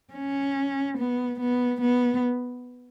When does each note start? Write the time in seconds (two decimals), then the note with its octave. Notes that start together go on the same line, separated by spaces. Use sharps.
0.13 C#4
0.97 B3
1.40 B3
1.81 B3